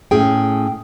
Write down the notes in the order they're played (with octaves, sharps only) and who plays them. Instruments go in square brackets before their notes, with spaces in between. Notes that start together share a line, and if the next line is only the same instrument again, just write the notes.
[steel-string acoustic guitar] A2 C#4 G#4 G5